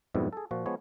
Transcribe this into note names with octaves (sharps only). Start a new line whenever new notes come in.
F2 G#2 B2 G3 E4
G#4 A4
A#2 F3 F#4
F3 G#3 B3 C#5